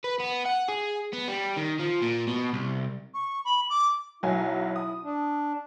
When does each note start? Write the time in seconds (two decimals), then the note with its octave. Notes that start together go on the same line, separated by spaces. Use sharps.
0.04 B4
0.20 B3
0.46 F#5
0.69 G#4
1.13 B3
1.28 G3
1.57 D#3
1.79 F3
2.02 A#2
2.28 B2
2.53 C2
3.14 C#6
3.45 B5
3.70 D6
4.23 B1 F#3 E4 G#5
4.76 D#6
5.04 D4